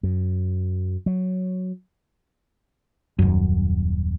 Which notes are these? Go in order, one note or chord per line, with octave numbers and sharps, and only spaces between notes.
F#2
F#3
D#1 F#2